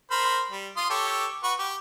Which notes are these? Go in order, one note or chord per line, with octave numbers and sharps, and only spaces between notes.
A#4 C5 B5
G3
F4 C6 D#6
G4 A4 C#5
F#4 B4 C#6
G4